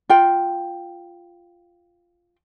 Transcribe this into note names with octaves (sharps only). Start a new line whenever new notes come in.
F4 G5